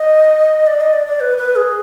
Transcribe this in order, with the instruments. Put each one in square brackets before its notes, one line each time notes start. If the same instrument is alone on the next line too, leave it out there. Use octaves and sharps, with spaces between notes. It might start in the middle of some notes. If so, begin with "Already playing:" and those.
Already playing: [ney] D#5
D5
D#5
D5
D5
B4
B4
G#4